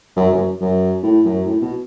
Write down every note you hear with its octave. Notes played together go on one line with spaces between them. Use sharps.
F#2
F#2
F#2
A2
F#2
A2
B2